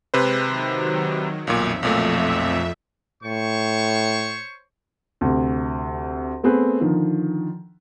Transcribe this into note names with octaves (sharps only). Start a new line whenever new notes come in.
C3 G#3 B4 C5 A#6
D#3 F#3
B1 F2 A#2 E5
B1 A#2 A3
A2 C5 C#5 C#6
D2 C3
A3 B3 C4 G#4 B4
D3 D#3 F3